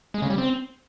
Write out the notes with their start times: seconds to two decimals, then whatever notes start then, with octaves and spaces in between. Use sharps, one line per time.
0.14 G#3
0.22 C#3
0.30 G3
0.38 C4